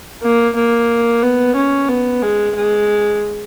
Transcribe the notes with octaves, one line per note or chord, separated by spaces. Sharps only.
A#3
A#3
B3
C#4
B3
G#3
G#3